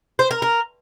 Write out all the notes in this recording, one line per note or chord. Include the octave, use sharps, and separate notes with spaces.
C5
A#4
A#4